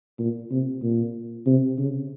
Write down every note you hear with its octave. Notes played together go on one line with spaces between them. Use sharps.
A#2
C3
A#2
C3
C#3